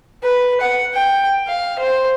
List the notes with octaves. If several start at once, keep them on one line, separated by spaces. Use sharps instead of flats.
B4
F#5
G5
F5
C5